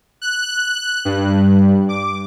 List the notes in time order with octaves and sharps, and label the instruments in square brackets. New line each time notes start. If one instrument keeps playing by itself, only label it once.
[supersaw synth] F#6
G2
D6